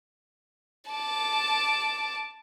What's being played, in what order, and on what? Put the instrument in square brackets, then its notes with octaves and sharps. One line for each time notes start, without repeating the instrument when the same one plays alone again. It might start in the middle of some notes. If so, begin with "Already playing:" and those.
[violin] A5 D6